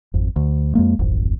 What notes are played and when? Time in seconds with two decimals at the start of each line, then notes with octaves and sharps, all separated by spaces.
0.14 G#1 F2
0.36 D2
0.75 F2 G#3 A#3
0.99 D1 G#1 F2